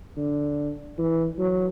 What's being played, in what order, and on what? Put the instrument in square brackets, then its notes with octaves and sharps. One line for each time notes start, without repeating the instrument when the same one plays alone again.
[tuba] D3
E3
F#3